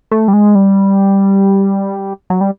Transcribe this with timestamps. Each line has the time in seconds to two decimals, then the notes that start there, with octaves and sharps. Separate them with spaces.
0.11 A3
0.28 G3
0.33 G#3
0.55 G3
2.30 F#3
2.41 G3